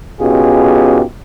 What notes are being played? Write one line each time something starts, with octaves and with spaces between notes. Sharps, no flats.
B2 C#4 D#4 F4 G4 G#4